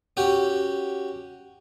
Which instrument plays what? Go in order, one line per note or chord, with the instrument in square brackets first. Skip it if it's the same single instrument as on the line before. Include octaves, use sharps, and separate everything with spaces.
[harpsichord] C#4 F#4 G4